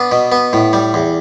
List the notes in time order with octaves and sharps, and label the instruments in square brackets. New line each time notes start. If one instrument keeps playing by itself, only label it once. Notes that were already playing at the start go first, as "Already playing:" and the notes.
Already playing: [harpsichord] B3 D4
B2
B3
A2
G3
E2